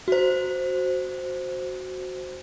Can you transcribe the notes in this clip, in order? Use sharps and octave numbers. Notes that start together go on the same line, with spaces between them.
F#4 C5